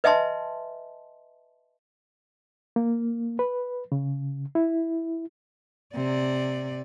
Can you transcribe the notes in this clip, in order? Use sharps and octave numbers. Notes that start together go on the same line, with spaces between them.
B4 D#5 E5 G#5 A5 C6
A#3
B4
C#3
E4
C3 D5